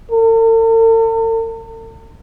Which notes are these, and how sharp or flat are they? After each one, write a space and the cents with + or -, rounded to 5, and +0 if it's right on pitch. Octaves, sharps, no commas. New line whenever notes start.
A4 +45